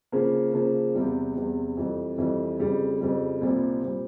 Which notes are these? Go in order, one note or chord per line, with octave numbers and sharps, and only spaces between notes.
C#3 F3 A#3
C#3 F3 A#3
E2 C3 G3
E2 C3 G3
F2 E3 G3
F2 E3 G3
F2 C#3 G3
F2 C#3 G3
C2 A#2 G3 C4
A#2 G3 C4